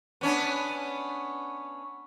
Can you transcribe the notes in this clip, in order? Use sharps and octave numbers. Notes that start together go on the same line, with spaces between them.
B3 C#4 D4